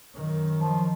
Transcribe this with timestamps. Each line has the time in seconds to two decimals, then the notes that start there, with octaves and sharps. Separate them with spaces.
0.14 F#2 D#3
0.60 F3